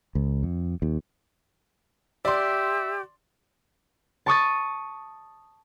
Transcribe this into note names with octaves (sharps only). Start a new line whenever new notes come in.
C#2
F2
D#2
G4 D5 E5 C6
A5 C#6 D#6 A6